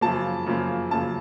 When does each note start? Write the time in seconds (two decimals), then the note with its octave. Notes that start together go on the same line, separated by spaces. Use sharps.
0.01 F#2 C#3 F3 A#3 A5
0.46 F#2 C#3 F3 A#3
0.91 F#2 C#3 F3 A#3 A5